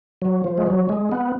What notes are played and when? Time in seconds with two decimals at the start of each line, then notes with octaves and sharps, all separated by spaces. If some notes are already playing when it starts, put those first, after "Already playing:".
0.22 F#3
0.44 F3
0.58 G#3
0.67 F#3
0.89 G#3
1.12 B3